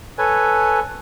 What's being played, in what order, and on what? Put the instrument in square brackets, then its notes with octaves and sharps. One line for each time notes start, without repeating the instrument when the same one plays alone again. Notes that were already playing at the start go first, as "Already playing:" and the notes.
[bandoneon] A4 B4 C#5 G#5